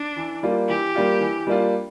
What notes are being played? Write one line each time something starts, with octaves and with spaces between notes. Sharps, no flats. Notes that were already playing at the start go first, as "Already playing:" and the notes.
Already playing: D4
E3
G3 A#3 D4 F4
E3 G4
G3 A#3 D4 F4
E3
G3 A#3 D4 F4